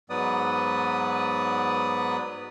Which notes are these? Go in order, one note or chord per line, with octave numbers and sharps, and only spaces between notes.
G#2 F#3 B3 B4 D5 D#6